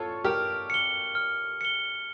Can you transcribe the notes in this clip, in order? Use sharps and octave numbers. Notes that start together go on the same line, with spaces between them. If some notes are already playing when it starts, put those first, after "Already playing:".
Already playing: F4 A4 C#5
G4 A#4 F6
C#7 G7
F6
C#7 G7